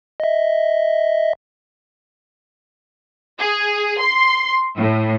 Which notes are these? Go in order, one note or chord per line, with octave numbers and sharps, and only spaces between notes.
D#5 E5
G#4
C6
A2